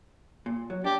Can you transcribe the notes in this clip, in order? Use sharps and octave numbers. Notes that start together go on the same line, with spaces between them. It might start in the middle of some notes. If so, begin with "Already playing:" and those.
A#2
F#3
D4 G4